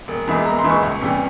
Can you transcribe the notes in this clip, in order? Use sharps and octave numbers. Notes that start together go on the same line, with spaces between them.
E1
E2 E3 G#3 E4
E1 A#5
C6
E2 E3 G#3 E4
C#6
C#2
C3 E3 G3 C#4